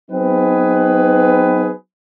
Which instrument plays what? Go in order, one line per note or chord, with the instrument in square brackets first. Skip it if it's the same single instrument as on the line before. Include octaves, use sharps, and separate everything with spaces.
[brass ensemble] F#3 B3 C4 D#4 G#4 B4